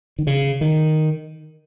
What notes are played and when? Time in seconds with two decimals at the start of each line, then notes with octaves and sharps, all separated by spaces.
0.19 D#3
0.27 C#3
0.61 D#3